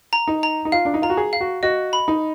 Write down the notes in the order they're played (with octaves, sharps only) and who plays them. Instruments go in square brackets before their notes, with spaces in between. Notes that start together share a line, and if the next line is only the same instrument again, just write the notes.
[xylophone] A#5
[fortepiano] D#4
[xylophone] A#5
[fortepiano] D#4
[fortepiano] F4 [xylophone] F5
[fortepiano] D4
D#4
[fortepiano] F4 [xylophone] A#5
[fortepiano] F#4
G#4
[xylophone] F5
[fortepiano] F#4
[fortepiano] F#4 [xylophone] D#5
[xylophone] B5
[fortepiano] D#4